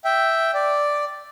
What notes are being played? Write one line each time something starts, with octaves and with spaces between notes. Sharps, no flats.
E5 G5
D5